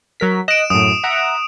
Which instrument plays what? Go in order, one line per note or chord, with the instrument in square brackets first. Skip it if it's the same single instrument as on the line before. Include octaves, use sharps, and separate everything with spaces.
[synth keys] F#3 A#4 B6
[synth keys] D#5 F#6 [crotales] D7 E7
[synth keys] F#2 A2 [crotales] D#6
[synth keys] E5 F#5 A#5